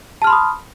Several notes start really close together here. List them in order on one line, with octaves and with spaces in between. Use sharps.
A5 F6 C6 B5 D#6